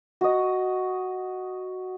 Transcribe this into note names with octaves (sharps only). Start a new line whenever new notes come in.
F#4 D#5